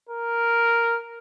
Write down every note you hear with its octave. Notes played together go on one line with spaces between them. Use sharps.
A#4